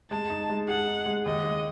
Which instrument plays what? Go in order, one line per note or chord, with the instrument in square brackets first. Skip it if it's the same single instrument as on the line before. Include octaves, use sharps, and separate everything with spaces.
[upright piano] G#3 [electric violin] A5
[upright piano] D#4
G#3
[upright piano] G#4 [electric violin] F#5
[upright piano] D#4
G#3
[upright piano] D#2 [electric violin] D#5
[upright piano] G#3